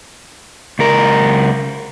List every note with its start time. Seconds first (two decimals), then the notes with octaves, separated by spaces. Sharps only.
0.79 C#2 A#4